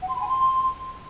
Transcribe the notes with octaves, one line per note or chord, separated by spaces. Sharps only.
F#5
C6
B5
G#5
C6